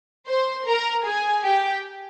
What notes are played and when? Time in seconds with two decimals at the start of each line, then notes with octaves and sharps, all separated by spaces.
0.28 C5 C6
0.67 A#4 A#5
1.05 G#4 G#5
1.44 G4 G5